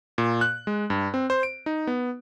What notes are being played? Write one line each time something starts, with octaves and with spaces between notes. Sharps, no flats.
A#2
F#6
G#3
G2
C4
C5
D7
D#4
B3